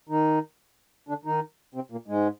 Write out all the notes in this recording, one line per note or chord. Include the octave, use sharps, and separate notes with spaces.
D#3 D#4
D3 D4
D#3 D#4
C3 C4
A#2 A#3
G#2 G#3